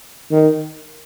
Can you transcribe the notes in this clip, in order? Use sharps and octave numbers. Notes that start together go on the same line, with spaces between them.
D#3